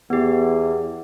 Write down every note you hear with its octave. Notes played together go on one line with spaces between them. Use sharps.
E2 B3 G4